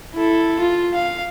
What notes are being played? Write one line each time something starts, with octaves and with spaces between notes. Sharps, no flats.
E4 A4
F4
F5